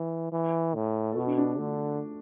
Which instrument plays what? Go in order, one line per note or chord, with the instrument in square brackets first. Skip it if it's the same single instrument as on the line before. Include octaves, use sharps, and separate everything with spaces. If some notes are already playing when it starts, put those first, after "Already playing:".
Already playing: [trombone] E3
E3
A2
[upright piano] A4
[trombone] B2 [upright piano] F#4
[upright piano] D4
D4
[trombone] D3 [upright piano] A3